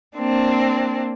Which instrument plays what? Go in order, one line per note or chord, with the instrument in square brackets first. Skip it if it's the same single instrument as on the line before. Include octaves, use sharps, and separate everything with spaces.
[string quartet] A#3 C4 D4